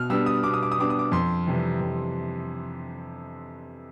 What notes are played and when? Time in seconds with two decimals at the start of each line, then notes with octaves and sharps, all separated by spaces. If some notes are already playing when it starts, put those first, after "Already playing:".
Already playing: B2 F6
0.10 G3 B3 D4 E6
0.26 D#6
0.43 B2 D6
0.53 D#6
0.63 D6
0.72 D#6
0.79 G3 B3 D4 D6
0.90 D#6
0.99 D6
1.12 F2 C6
1.47 C3 E3 G3
1.81 F2